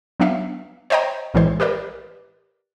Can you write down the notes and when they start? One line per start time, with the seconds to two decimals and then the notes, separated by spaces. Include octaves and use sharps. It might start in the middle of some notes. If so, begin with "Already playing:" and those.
0.20 F#3 B3 D4 E5 F5
0.90 C5 C#5 D#5 G5 A#5
1.34 B1 A2 E3 G#3 C5
1.60 G4 A#4 B4 D5